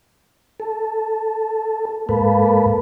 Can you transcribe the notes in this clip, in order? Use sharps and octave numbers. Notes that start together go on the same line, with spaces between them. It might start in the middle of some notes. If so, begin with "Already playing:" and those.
A4
G#2 A#3 A4 B4